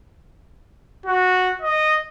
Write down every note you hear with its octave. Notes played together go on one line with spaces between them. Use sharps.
F#4
D#5